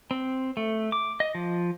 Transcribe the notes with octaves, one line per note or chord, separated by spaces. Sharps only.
C4
A3
D6
D#5
F3